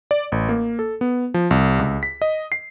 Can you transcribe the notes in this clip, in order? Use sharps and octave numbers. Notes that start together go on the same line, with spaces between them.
D5
A1
A#3
A4
B3
F3
C2
C#2
B6
D#5
C7